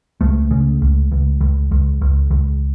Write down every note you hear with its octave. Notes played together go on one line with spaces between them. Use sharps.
C#2 A3
C#3
C#2
C#2
C#2
C#2
C#2
C#2